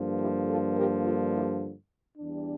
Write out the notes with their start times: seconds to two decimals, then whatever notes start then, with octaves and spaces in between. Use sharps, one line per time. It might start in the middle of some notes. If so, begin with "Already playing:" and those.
Already playing: G2 D3 F3 A#3
0.18 E4 G4
0.47 F4 A4
0.76 G4 A#4
1.04 F4 A4
1.32 E4 G4
2.18 E2 E3 G3 D4